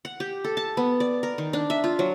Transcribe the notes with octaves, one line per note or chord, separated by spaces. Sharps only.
F#5
G4
A4
A5
B3
D5
A#4
D#3
D4
E5
F4
F#3